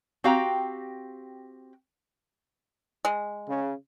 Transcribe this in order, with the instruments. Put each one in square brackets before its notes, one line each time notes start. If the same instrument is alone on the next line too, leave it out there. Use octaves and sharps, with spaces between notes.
[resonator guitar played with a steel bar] C4 F#4 G4 F5 G5 A#5
[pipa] G#3
[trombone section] C#3